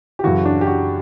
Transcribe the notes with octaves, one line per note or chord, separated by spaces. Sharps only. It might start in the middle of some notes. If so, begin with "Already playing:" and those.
G4
F#2 C#3 E3 F#4
D4
G4
F#4